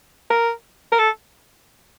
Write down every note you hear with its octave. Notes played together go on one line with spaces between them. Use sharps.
A#4
A#4
A4